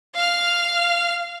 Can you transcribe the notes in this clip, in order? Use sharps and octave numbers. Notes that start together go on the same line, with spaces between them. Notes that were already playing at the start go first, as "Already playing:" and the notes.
F5 F6